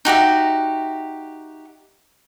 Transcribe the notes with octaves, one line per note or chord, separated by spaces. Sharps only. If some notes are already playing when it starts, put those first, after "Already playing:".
D#4 F#4 G4 E5